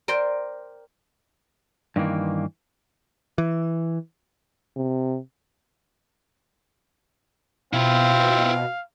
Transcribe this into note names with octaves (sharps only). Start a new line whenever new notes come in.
A#4 C5 D5 G5
G2 D#3 E3 A#3
E3
C3
B2 C4 E4 F4 F5